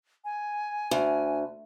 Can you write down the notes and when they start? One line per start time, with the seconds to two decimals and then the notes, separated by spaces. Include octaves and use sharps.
0.25 G#5
0.91 D2